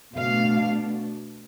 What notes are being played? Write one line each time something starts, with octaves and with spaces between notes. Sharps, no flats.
B2 A3 D4 F5